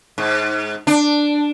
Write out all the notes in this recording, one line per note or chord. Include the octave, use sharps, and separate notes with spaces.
G#2
D4